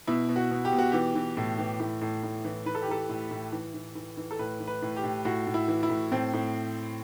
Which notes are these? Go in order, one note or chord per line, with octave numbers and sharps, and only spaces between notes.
B2 E4
B2
F#4
B2
G4
B2
F#4
E3 G4
E3
A2
E3
A2
A2
A2
E3
E3 B4
A4
G4
E3 A4
A2
A2
E3
E3
E3
E3
A4
A2 B4
E3
B4
A2
G4
A2
A2 F#4
A2
E4
E3
E4
A2
A2 C4
A2